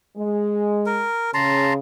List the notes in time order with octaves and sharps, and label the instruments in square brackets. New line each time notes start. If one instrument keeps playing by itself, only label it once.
[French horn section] G#3
[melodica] A#4
[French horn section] C#3 [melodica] A5 A#5 C6